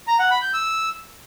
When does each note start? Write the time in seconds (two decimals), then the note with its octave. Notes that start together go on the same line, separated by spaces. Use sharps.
0.08 A#5
0.19 F#5
0.31 B5
0.42 G6
0.54 E6